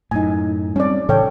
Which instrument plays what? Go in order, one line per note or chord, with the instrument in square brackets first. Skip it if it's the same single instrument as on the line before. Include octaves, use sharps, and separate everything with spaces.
[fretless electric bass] F#2 A2 [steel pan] D#4 G#5
[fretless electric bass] G3 C4 [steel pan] C#4 D5
[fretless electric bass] A2 C#3 E3 [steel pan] A4 C#5 G5